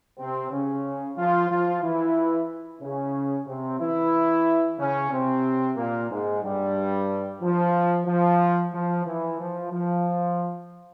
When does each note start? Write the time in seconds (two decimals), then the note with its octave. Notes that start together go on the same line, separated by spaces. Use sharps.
0.18 C3 C4
0.50 C#3 C#4
1.16 F3 F4
1.49 F3 F4
1.82 E3 E4
2.81 C#3 C#4
3.46 C3 C4
3.79 E3 E4
4.77 C#3 C#4
5.11 C3 C4
5.76 A#2 A#3
6.09 G#2 G#3
6.42 G2 G3
7.41 F3
8.06 F3
8.72 F3
9.05 E3
9.39 F3
9.71 F3